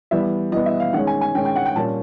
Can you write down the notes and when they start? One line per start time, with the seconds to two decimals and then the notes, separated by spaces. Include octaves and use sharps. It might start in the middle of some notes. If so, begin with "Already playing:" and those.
0.11 E3 G3 B3 E5
0.52 E3 G3 B3 D#5
0.66 E5
0.80 F5
0.93 D#3 G#3 C#4 F#5
1.07 G#5
1.21 G#5
1.35 D#3 G#3 C#4 G5
1.45 G5
1.56 F#5
1.66 G5
1.75 A#2 G3 A#3 C#4 A5